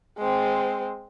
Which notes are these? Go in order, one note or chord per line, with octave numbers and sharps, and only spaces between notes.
G#3 C4